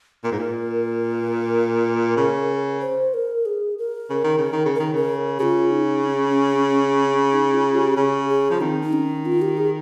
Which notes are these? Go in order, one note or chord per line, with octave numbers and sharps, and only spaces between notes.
A#2 A#4
G#2
A#2
C#3
C5
A#4
G#4
A#4
C#3
D#3
C#3
D#3
C#3
D#3 A#4
C#3 A#4
C#3 F4 G4
D#4
C#4
D#4
F4
G4
C#3 G#4
G#4
F3
D#3 C4
D#4
C#4
F4
G4
G#4